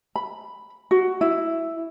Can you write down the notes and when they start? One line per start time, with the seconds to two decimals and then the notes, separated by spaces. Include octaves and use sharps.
0.16 B5
0.91 F#4
1.21 E4